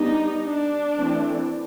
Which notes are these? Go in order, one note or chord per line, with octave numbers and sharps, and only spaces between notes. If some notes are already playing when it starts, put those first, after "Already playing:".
Already playing: G3 B3 D4 D#4
D4
E3 A3 C4